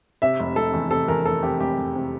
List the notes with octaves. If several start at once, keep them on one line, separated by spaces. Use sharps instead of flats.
C3 E5
F1
F1 A4
E2
C3 A4
E2 A#4
F1 A4
C3 G4
F1 G4
F1
C3